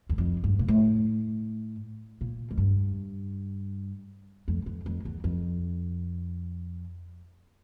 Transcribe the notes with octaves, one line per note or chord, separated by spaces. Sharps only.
E2
F2
G2
A#2
A2
A#2
F2
G2
F2
F2
F2
E2
F2